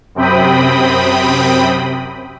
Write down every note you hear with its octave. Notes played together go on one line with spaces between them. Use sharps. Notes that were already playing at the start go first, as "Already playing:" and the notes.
F#2 C3 C4 G5 B5 D#6